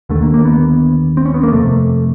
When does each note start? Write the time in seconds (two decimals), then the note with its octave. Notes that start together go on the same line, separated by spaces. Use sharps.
0.10 D#2 D3 A3
0.22 A#3
0.34 A#3
0.45 B3
1.17 C4
1.26 C#4
1.34 B3
1.43 A#3
1.52 F2 C3 A3